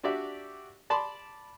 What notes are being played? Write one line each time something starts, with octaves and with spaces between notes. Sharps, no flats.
D4 F#4 G4 D5 E5
D5 A5 B5 C6 D6